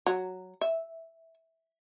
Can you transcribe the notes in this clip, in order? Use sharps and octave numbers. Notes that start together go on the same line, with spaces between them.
F#3
E5